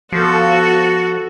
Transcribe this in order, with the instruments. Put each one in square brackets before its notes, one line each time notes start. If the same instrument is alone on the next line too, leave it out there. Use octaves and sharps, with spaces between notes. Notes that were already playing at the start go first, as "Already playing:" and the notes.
[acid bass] F3 [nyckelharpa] B3 A4 [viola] F#4